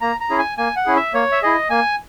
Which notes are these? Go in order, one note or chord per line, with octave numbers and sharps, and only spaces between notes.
A#3 A#5
A#5
C#4 E4 G#4
G#5
A#3 G#5
F#5
C#4 E4 G#4
E5
A#3 C#5
E5
E4 G#4 D#5
A#3 G#5